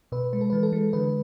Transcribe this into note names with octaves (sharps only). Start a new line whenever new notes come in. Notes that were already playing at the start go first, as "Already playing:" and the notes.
B2 B4
G#3 B4
A4
E3 B4
A4
G#3
D3 B4